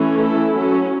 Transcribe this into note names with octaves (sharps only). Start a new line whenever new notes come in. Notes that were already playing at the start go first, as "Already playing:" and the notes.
Already playing: E3 A3 C#4
E4 A4
F#3 C#4